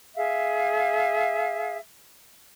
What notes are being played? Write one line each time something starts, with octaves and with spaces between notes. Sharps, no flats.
G#4 E5 F5